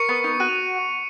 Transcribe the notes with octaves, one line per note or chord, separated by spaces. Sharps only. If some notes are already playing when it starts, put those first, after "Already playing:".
Already playing: A#4 C#6 C#7
B3
D#4
F#4 D#7
F7